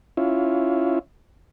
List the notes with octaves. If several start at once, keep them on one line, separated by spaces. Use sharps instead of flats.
C#4 E4 F4